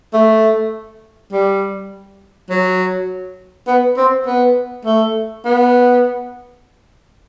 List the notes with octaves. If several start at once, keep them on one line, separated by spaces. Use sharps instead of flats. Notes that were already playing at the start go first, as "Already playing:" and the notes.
A3
G3
F#3
B3
C4
B3
A3
B3